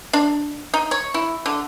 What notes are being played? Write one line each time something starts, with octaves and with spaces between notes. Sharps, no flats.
D4
D#4
C#5
E4
D3